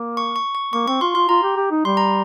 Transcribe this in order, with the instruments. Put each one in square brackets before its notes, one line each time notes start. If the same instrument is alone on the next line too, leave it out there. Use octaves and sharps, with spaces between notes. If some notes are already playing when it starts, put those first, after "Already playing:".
Already playing: [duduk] A#3
[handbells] C#6
C#6
C#6
[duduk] A#3 [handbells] C#6
[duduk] C4 [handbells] C#6
[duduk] F4 [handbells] C6
[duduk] F4 [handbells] C6
[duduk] F4 [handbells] A#5
[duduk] G4
G4
D#4
[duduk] G3 [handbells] C6
[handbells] A#5